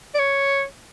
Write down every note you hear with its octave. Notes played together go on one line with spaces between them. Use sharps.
D5
C#5